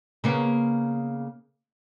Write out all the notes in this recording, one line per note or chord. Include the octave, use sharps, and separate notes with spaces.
C#3 A#3 B3